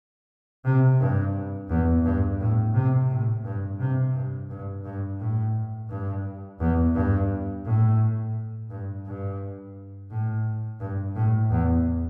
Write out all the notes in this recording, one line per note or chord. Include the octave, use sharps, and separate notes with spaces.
C3
G2
E2
G2
A2
C3
A2
G2
C3
G2
G2
G2
A2
G2
E2
G2
A2
G2
G2
A2
G2
A2
E2